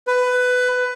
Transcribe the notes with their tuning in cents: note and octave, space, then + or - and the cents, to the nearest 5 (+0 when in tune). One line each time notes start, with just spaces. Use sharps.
B4 +15